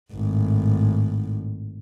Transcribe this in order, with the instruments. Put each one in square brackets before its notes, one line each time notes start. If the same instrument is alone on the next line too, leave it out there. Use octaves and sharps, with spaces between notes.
[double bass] G#1 A2